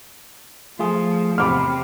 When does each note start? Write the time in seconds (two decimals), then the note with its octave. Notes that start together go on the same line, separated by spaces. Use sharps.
0.79 F3 A3 F4 G#4
1.38 E2 C3 C4 G4 B5 D6 F6